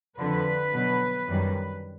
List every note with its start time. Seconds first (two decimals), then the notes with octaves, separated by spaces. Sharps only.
0.17 F2 D3 F3 B4
0.73 B2 F#3
1.28 F#2 D#3 G3